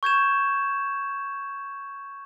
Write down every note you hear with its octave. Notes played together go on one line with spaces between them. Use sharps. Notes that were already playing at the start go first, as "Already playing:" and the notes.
C#6 G6 G#6 E7